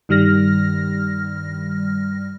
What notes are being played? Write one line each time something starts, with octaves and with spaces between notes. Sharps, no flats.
G2 D#3 G3 F6 A#6